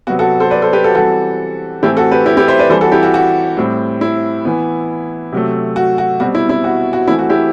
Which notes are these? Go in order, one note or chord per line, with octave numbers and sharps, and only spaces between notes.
C3 F#3 B3 F#4
F#4 A4
A4 C5
B4 D5
A4 C5
G4 B4
F#4 A4
E3 G3 C4 F#4 A4
A2 E3 A3 C4 E4 G4
F#4 A4
G4 B4
E4 G4
E4 G4
C5 E5
B4 D5
E3 G3 C4 A4 C5
F#4 A4
E4 G4
F#4
F#4
A2 G3 C4
E4
E3 B3
C3 F#3 A3
F#4
F#4
B2 G3 C4 F#4
E4
E4
F#4
F#4
E3 A3 C4 E4
F#4
E4 G4